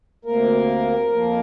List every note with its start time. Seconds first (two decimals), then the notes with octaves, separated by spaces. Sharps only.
0.25 D2 C3 A#3 A#4
1.12 F2 F3 A#3